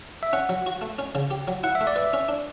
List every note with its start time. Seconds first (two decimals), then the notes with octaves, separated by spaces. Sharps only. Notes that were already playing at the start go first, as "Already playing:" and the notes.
0.23 E5
0.33 C#4 F#5
0.49 F#3
0.66 F#4
0.82 A3
0.99 C#4
1.15 C#3
1.31 G4
1.48 F#3
1.63 E4 F#5
1.75 E5
1.81 A3
1.87 D5
1.96 B4 E5
2.13 C#4
2.28 D4